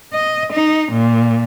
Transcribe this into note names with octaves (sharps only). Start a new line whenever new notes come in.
D#5
D#4
A#2